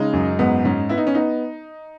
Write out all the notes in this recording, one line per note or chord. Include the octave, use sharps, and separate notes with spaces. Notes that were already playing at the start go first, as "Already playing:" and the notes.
Already playing: C#3 G#3 D#4
F#2
G#2 B3
G#2 C#4
B3 E4
D#4
C#4
B3 D#4